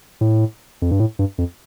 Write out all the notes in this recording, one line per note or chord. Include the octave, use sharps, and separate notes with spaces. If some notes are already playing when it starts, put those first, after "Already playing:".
A2
F2
G2
A2
G2
F2